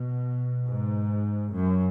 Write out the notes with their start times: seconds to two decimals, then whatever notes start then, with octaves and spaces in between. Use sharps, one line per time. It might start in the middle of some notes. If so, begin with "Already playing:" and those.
Already playing: B2
0.67 G#2
1.54 F#2